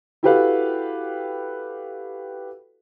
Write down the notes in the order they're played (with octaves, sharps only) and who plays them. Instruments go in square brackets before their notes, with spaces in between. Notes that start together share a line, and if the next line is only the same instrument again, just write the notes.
[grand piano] E4 F#4 G4 A4 B4 F5